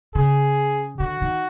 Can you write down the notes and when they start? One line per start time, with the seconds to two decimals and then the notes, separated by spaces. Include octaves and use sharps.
0.15 C#3 G#4
1.00 D3 F#4
1.22 D#3